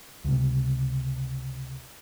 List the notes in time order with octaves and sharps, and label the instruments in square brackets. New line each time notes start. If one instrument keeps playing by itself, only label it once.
[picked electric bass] C#2 C3